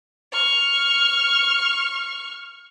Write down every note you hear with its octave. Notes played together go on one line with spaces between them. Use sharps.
C#6 F6